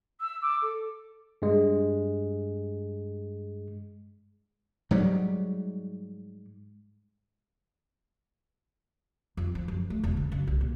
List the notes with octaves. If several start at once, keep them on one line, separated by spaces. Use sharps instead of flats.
E6
D6
A4
G2 G#3
G#2 F#3 G3
F2
F3
F#2
A3
E1
C#3
F#2
C2
A#2